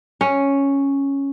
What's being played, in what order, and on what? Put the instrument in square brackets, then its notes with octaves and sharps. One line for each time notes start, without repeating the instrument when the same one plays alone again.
[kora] C#4